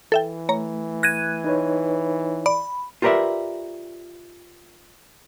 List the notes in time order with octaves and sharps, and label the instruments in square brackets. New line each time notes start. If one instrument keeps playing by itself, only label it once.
[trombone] E3 [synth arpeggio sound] A4 E5 G5
[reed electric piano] A3 [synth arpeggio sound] C#5 A#5
[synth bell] F#6 G#6 D#7 [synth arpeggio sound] A#6
[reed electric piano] D#4 B4 C#5
[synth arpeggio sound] D5 [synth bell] B5
[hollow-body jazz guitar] F4 G4 A#4 B4 D5 E5